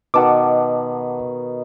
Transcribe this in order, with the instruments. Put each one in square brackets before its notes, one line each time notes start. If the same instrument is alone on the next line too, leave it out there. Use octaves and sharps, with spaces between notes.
[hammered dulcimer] B2 D#3 [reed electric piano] F#5 A5 D6